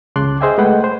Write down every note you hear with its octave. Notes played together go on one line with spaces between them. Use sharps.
C#2 C#3 A5 C6 D6 F#6
G#4 C5 D#5 E5 G5 G#5
G#3 A3 B4 F#5 G5
C5